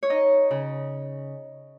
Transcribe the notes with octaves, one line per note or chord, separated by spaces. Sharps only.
C#5
D#4 D#5
C#3